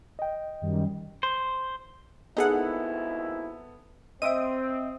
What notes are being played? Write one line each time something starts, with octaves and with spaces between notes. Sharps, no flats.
D#5 G5
F#2 D#3 G3
C5
G#1 D#2 B3 D#4 E4 G#4 A4 F#5
C4 C5 D#5 E5 D#6 D7 D#7